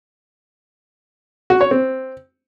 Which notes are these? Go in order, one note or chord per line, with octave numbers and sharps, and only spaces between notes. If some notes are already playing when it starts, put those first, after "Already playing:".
F#4
C#5
C4